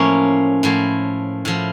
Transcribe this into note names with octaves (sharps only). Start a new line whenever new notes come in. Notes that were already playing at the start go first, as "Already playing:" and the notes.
Already playing: A2 F3 A#3 C#4
A2 F3
A2 F3